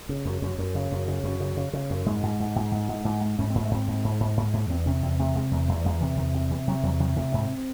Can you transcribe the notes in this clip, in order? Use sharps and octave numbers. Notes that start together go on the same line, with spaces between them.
C#3
F#2
F#2
F#2
C#3
F#2
C#3
F#2
C#3
C#3
C#3
F#2
G#2 G#3
G#2
G#2
G#2
G#2
G#2
G#2
G#2
G#2 C#4
G#2 C4
A3
G#2 C4
G#2
G#2
G#2
G#2
G#2
E2 C4
C3 C#4
E2 C4
C3 A3
C3 G#3
E2 A3
E2 A3
E2 G#3
C3 E3
E2 D#3
C3
C3 E3
C3 F#3
E2 F#3
C3 F#3
C3 A3
G#2 C4